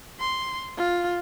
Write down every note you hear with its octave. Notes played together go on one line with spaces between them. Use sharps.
C6
F4